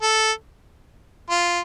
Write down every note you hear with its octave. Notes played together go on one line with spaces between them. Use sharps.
A4
F4